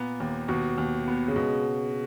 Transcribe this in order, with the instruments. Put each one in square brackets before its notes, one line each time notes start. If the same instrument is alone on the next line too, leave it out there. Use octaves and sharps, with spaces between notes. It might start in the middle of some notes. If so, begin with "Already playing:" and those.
Already playing: [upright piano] A#2 [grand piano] B3
[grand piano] D#2
[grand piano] D#2 [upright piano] B2
[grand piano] D#2
B3
[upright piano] C#3
[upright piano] B2 [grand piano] G#3